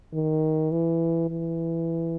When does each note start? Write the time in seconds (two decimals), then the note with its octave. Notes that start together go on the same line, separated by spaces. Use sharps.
0.13 D#3
0.72 E3
1.30 E3